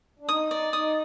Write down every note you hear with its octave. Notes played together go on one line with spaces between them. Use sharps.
D4
D#4 D#6
D5
D#4 D#6